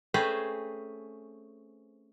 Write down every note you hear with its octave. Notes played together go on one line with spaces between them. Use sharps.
A3 C4 C#4 G#4 B4 C5